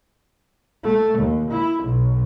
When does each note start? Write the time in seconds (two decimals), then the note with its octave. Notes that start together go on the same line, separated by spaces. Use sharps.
0.83 A3
1.18 D#2
1.51 E4
1.83 B1